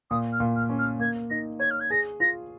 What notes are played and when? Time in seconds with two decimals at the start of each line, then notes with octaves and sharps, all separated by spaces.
0.10 A#2 D#6
0.32 F6
0.40 A#2
0.56 F6
0.70 C#4
0.78 F6
1.00 A#3 G#6
1.30 D#4 A#6
1.60 C#5 G#6
1.70 F6
1.80 G#6
1.90 G#4 A#6
2.20 F4 A#6